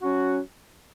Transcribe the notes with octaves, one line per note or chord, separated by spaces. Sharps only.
F#3 C#4 F#4